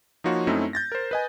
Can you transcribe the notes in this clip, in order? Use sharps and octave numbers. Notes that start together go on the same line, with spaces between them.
F3 A#3 D#4 F4 F#4 C#5
F#2 A3 C4 C#4 D#4 E4
G6 A6 A#6
A#4 C5
B4 D#5 G#5